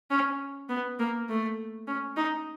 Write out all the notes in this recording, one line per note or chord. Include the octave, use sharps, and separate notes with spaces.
C#4
B3
A#3
A3
C#4
D#4